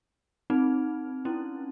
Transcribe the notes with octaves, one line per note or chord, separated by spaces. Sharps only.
C4 D#4
C#4 E4